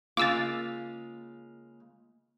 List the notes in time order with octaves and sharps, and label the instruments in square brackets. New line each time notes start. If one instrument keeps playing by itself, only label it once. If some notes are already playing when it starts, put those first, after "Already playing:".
[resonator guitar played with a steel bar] C#3 G#3 F4 [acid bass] A#3 [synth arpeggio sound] D6 E6 A6